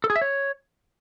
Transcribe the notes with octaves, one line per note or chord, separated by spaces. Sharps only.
A4
G#4
E5
C#5